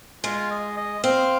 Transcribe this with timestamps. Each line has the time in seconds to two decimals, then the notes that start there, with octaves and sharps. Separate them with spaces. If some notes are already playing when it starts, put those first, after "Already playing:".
0.24 G#3 F4
0.51 D#5
0.77 D#5
1.04 C4 F5